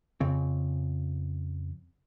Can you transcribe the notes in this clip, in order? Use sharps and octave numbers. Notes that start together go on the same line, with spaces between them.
F2 C#3 C4